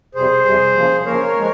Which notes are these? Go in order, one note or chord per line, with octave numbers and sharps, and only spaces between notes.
F2 C3 G3 G#4 C5
F2 C3 G3
D#2 C#3 F3 A#3
D#2 C#3 F3 A#3 A#4 C#5
F3 G#3